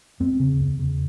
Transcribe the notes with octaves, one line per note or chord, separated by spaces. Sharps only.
E2 C4
C#3
E2
C#3